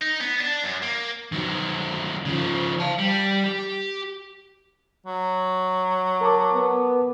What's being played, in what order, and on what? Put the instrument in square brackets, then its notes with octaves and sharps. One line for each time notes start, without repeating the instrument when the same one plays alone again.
[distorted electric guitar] D#4
B3
D4
F#2
A#3
D#3 F#3
C#3 F3
F5 A5
G3
G4
[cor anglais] F#3
[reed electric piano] A#4 A5 D6
[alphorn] B3